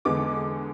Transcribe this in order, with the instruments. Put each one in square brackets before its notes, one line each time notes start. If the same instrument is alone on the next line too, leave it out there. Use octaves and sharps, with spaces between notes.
[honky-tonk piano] E2 D3 G#3 B3 D6